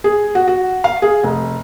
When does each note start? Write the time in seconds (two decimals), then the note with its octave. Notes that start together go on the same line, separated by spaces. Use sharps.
0.04 G#4
0.35 F#4
0.48 F#4
0.84 F5
1.02 G#4
1.23 F1